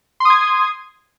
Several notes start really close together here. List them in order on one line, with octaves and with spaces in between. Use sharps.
C6 D#6 G#6